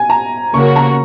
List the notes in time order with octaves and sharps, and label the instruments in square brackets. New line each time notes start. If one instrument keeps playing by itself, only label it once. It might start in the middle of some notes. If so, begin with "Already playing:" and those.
Already playing: [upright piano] G#5
A#5
[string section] C#3 A#3 F#4 A#4 [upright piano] C#6
[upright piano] A#5